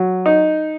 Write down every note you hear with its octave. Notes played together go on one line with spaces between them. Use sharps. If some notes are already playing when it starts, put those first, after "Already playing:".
Already playing: F#3
D#4